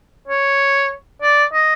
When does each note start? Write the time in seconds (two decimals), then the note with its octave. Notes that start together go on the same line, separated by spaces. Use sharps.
0.28 C#5
1.22 D5
1.53 D#5